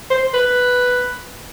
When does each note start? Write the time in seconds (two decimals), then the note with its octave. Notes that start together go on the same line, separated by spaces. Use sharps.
0.11 C5
0.34 B4